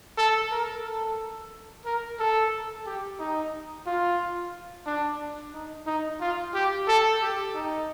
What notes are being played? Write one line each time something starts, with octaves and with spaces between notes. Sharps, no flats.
A4
A#4
A4
A#4
A4
G4
D#4
F4
D4
D#4
D#4
F4
G4
A4
G4
D#4